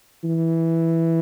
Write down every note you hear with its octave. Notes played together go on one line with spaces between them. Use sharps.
E3